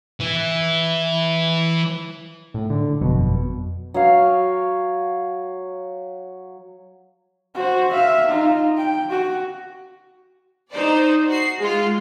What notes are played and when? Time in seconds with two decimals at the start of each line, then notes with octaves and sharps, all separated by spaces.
0.21 E3 E4
2.54 A2
2.70 D3
3.01 G1 F2 B2 F#3
3.94 F#3 C#5 F5
7.54 F#4 C5
7.92 E5 F5
8.28 D#4 F4
8.78 G5
9.10 F#4
10.71 D#4 C5 D5
11.27 F#4 C7
11.60 G#3 F4